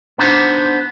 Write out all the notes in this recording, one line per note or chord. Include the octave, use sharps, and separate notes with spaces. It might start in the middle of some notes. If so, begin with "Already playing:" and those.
B3 D4 D#4 C5 F#5